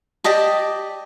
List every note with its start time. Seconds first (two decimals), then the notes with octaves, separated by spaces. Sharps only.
0.24 G4 D5 D#5 A5